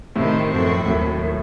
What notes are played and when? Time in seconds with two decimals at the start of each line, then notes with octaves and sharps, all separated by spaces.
0.15 A2 C3 D#3 A3 C4 D#4
0.51 F#2 F3 C4 F#4 A4
0.86 D#2 A2 D#3 F#3